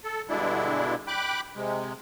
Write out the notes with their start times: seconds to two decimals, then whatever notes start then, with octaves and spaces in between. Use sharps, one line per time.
0.04 A4
0.29 G2 B2 D3 G#3 D4 E4
1.07 G5 B5 D6 F#6
1.56 C3 G#3